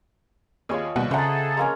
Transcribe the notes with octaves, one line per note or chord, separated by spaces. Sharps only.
D#2 F4 G#4 C#5 D#5
D#2 B2 G3 F#5
C#3 G#4 A4 C5 E5 F#5 A5 A#5
G#3 A#3 C#4 A#5